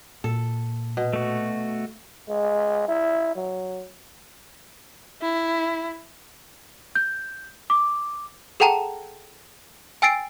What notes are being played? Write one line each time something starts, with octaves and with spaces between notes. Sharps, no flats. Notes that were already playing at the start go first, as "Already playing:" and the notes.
A#2 A4
B2
A3 F#4
G#3
E4
F#3
E4
G6
D6
G#4 A4 F#5 G5 A5 A#5
G5 G#5 E6 A6 C7 D7